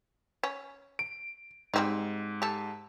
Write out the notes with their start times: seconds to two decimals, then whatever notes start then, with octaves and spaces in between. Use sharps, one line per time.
0.43 C#4
0.99 D7
1.74 G#2 G3 C4 D#4
2.42 G4 A4